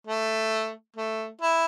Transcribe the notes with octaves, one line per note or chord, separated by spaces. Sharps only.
A3
A3
E4